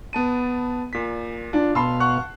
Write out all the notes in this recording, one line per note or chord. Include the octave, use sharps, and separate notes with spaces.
B3 A5 D#7
A#2 B6
D4 F4
B2 F5 A5 C6 E6
F#5 C#6 F#6